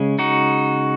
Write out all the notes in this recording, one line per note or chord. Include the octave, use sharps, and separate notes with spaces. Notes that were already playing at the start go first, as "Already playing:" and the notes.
Already playing: C#3 G#3 C#4
D#4 F#4